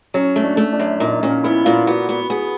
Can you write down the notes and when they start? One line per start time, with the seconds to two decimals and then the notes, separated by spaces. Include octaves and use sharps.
0.14 F#3 C#4
0.36 A3
0.44 D4
0.57 A3
0.73 D4
0.80 F#2
1.00 A#2 D#4
1.23 A#2 C#4
1.44 B3 E4
1.65 A#2 F4
1.87 B3 F#4
2.09 B3
2.30 B3 G#4